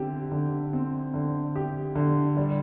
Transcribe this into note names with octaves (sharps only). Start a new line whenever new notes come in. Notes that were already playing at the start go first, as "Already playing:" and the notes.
Already playing: D3 C4 G4
D3
C4
D3
G4
D3
G3